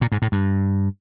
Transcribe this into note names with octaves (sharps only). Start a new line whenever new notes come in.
A#2
G#2
A2
G2